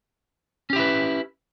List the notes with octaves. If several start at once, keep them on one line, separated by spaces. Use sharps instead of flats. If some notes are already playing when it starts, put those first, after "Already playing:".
C#4 E4 G4 B4